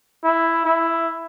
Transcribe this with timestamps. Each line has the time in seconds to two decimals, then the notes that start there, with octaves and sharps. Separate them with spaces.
0.24 E4
0.65 E4